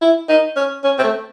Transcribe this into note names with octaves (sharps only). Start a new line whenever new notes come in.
E4
D#4
C#4
C#4
C4
A3